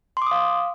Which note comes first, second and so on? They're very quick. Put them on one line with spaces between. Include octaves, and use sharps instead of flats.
C6 D6 D#6 F5